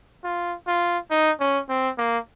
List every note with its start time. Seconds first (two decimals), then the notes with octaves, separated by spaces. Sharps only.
0.24 F4
0.67 F4
1.11 D#4
1.40 C#4
1.69 C4
1.98 A#3